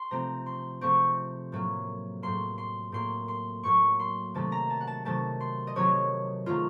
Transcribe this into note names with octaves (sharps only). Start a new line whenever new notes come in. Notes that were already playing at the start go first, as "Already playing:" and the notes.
Already playing: C6
C3 F3 A3 C4 A#5
C6
C3 F3 A3 C4 C#6
A2 F#3 A#3
A2 F#3 A#3 C6
C6
A2 F#3 A#3 C6
C6
A2 F#3 A#3 C#6
C6
C3 D#3 F#3 A3 A5
A#5
A5
F#5
A5
C3 D#3 F#3 A3 A5
C6
D#5
C3 D#3 F#3 A3 C#5
C3 D#3 F#3 A3 F4